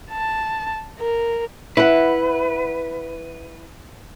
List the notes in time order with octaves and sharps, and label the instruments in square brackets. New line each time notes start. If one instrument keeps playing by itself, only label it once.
[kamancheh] A5
A#4
[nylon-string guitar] E4 F#5 [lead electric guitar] B4